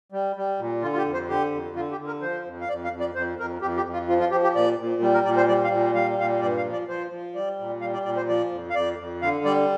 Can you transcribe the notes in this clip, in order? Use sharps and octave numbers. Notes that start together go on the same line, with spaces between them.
G3
G3
A#2
D3 F4
F4
G4
F2
C5
D3 G4
F2
D3 F4
G4
D3
A#4
F3 C5
F2
F5
F2 D5
F5
F2
D5
F2 C5
F2 A#4
F2 G4
G4
F2
F4
F3 F4
F4
F3 G4
G4
A#2 D5
A#2
G3
A#4
A#2 D5
C5
G3 D5
F5
A#2
G3 F5
A#2 F5
G2 D5
F5
F3
D5
F3 C5
F3
G3 D5
A#2
G3 F5
D5
A#2 D5
C5
F3 D5
F2
F5
F2 D5
F2
D3 F5
G3 D5